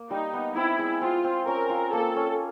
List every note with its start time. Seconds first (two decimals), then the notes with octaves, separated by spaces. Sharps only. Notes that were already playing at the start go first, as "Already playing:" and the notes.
Already playing: A#3
0.10 G3 D#4
0.33 B3
0.56 C4 E4
0.79 G#3
1.01 C4 F4
1.24 C4
1.47 C#4 A#4
1.70 F4
1.93 A#3 A4
2.16 C#4